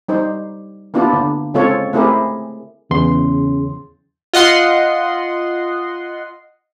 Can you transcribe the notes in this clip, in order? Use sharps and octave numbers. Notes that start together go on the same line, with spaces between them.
G3 D#4 C5
A#3 B3 D4 E4 F4 G4
D3
C#3 G#3 C4 F4 A4 C#5
A3 C4 E4 G4 G#4 A#4
E2 C#3 C6
F4 D#5 F#5 C6